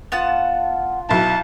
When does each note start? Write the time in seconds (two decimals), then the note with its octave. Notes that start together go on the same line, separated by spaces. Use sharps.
0.12 B3 F4 F#5 A5 C#6
1.09 B1 E4 A5